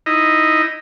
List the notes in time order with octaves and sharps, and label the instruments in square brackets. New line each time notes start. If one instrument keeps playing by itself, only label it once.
[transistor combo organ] D#4 E4 D#5